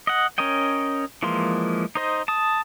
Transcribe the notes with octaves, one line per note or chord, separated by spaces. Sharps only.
D#5 F#5
C#4 A#4 C#5 D#5 G5
E3 F3 G#3 A#3 C6
D#4 C5 D#5
A5 D#6